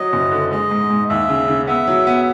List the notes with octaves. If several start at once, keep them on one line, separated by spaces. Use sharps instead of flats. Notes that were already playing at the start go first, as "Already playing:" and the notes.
Already playing: F#3 D#5
F#1
D3
G#3 D#5
G#2
G#2
D#2 E5
C#3
C#3
B3 E5
F#3
B3